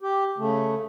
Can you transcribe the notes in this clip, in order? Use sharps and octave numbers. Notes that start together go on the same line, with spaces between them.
G4
C#3 A3